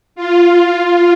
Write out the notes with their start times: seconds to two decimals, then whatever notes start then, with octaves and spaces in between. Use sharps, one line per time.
0.16 F4
0.77 F4